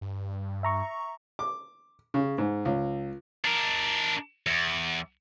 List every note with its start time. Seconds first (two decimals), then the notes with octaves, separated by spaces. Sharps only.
0.01 G2
0.63 E5 A#5 C#6
1.39 D6
2.14 C#3
2.38 G#2
2.65 C#2
3.45 D4 A#4
4.47 E2